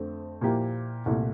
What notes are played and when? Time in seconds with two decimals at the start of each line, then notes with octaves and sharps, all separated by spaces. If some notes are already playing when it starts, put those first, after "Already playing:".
Already playing: F2 D3 A3 C4
0.41 A#2 F3 A#3 E4 G4
1.06 C2 A#2 A3 E4